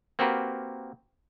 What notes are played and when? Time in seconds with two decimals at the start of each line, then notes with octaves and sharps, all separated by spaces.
0.19 A#3 C4 F#4 G4 A#4 B4